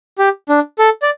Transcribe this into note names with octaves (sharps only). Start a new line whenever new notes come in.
G4
D4
A4
D5